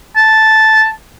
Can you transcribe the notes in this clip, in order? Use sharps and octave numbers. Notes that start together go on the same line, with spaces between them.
A5